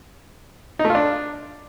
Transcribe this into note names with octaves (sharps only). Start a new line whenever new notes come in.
D#4
A3
F4
D4